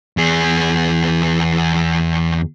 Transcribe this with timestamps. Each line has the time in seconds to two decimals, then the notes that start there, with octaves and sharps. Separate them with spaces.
0.17 E2 G#4